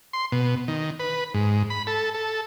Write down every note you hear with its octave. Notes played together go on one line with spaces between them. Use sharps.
C6
B2
D#3
B4
G#2
B5
A4
A4